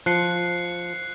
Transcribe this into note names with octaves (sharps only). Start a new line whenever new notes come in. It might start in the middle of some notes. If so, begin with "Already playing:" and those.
F3 F#6 C7 C#7